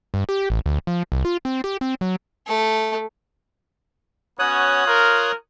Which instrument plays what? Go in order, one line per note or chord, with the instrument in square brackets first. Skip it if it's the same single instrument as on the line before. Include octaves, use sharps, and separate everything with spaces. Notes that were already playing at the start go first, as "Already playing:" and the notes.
[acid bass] G2
G4
A1
D2
F3
C2
F4
C4
G4
C4
F#3
[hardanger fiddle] A3 A4
[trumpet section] B3 C#4 F#4 [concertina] C#5 D#6 F#6
[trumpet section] F4 A#4